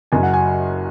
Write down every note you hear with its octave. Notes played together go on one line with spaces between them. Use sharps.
F#1 F#2 F#3 G#5
F#5
G#5